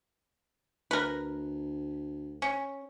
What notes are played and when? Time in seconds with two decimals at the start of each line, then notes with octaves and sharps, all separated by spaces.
0.91 D2 A#4 B4
2.42 C#4